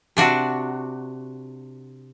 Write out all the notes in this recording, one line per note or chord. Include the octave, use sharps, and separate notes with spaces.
C3 D4 F#4